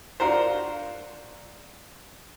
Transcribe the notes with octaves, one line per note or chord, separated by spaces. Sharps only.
D4 F4 F#4 A#4 C5